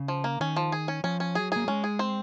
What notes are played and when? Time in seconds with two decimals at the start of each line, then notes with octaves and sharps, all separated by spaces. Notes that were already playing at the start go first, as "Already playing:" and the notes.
Already playing: C#3
0.08 F3
0.24 A#3
0.40 D#3 C#4
0.56 F3
0.72 G#4
0.88 C#4
1.04 F3 C#4
1.20 C#4
1.35 F#3 G#4
1.52 A#3 G#4
1.67 G#3 C#4
1.84 G#4
1.99 C4